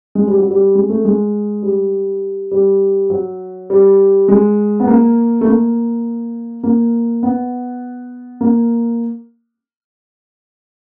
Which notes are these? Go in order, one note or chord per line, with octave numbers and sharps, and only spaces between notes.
G#3
G3
F#3
G3
G#3
A3
G#3
G3
G3
F#3
G3
G#3
B3
A#3
A3
A#3
A#3
B3
A#3